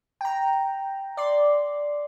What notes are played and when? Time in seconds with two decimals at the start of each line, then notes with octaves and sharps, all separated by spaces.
0.21 G5 A#5
1.17 D5 C6